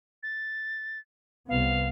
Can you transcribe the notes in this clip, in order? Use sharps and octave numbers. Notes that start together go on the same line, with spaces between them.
A6
C2 B3 F5